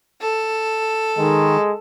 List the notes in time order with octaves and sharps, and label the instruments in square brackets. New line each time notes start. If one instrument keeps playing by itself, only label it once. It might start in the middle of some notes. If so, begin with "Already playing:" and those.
[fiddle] A4
[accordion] D#3 [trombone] G#3